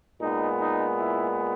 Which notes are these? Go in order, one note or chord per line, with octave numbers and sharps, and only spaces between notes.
A#2 G#3 B3 D#4
D#4
E4